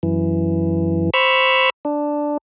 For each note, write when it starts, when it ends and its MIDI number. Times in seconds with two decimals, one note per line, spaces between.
0.03 1.10 42
0.03 1.10 52
1.14 1.70 72
1.14 1.70 83
1.14 1.70 85
1.14 1.70 88
1.14 1.70 89
1.85 2.37 62